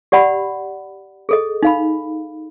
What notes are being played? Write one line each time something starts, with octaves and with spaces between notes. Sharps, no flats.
G4 D5 F#5 B5
G#4 A4 D#5
D#4 F5 B5